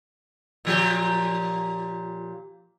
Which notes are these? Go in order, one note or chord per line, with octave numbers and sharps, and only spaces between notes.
A#2 F3 G4